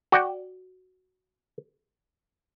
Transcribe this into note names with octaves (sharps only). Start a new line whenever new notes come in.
F#4 D5 F#5 G5